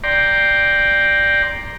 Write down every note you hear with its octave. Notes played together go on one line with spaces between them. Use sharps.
D5 G5 A#5 C6